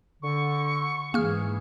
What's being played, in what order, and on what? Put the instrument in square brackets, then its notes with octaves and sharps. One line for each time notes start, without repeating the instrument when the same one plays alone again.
[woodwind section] D3 [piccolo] C#6
[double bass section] G#2 E3 [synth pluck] A#3 F6 [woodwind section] G#4